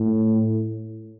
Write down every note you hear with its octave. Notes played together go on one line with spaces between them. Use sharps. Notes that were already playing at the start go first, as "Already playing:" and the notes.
Already playing: A2